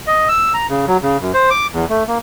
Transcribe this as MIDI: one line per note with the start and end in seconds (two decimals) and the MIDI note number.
0.07 0.28 75
0.29 0.53 88
0.54 0.67 82
0.69 0.85 49
0.88 0.97 54
1.02 1.17 49
1.21 1.32 42
1.34 1.50 72
1.50 1.67 86
1.73 1.85 40
1.89 2.03 57
2.08 2.18 58